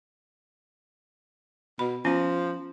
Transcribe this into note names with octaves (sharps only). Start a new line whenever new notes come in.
B2 B5
F3 B3 C#4 F4